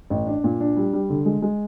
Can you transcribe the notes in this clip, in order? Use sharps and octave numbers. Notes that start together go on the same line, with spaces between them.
A1
D4
A#2
D4
G3
G3
D3
G#3
G#3